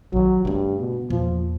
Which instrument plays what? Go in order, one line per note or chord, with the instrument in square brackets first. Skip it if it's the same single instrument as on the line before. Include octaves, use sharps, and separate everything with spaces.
[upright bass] A#1 D#3 [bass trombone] F#3
[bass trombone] G2 [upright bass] C#3 A3
[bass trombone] B2
[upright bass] E2 A#2 [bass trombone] F3